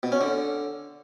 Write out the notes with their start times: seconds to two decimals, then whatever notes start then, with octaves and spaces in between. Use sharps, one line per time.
0.03 B2
0.12 C#4
0.21 D3